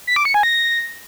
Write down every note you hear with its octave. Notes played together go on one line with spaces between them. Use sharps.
B6
D6
C#7
G#5
A#6